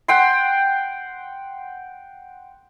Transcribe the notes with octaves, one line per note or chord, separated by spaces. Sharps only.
F#5 G5 C6